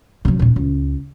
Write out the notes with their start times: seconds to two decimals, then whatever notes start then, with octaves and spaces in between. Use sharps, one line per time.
0.25 C3 F#3
0.39 D#1 A#2
0.56 C#2